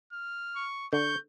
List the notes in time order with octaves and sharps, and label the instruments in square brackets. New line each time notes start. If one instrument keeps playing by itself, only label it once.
[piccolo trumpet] F6
[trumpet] C#6
[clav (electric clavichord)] D3 [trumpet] C#6 [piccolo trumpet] G6